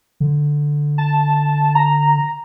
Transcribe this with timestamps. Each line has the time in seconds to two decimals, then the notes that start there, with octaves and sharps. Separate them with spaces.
0.20 D3
0.98 A5
1.75 A#5